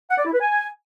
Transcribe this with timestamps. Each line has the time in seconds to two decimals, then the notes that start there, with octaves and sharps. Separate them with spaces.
0.11 F#5
0.18 D5
0.26 E4
0.33 B4
0.41 G#5